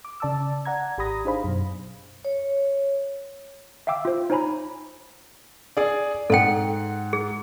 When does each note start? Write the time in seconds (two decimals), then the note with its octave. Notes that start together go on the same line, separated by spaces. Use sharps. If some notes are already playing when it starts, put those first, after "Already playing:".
0.05 D6
0.20 C#3 D5 A5 D6 E6
0.65 D5 F#5 A#5 G#6
0.98 G#1 G4 A#5 B5 D#6 A#6
1.25 D4 D#4 G#4 C5 F5 B5
1.44 F#2 B2
2.25 C#5
3.87 E5 F5 G5 D6 E6
4.05 F4 C5
4.30 D#4 C5 C#5 G#5 A#5 B5
5.77 G#4 D5
6.30 G#2 A4 F#5 G5
7.13 G#4